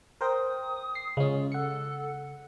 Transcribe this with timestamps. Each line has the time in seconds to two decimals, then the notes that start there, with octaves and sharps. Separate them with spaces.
0.21 A#4 C5 G5 D#6
0.95 C7
1.17 C#3 G#3 C#4 F4
1.52 A4 F#5 C#7